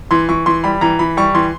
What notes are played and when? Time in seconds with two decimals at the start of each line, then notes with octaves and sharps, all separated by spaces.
0.11 E3 C6
0.29 E3 C#6
0.46 E3 C6
0.64 G3 B5
0.81 E3 A#5
0.99 E3 B5
1.17 G3 C#6
1.34 E3 C6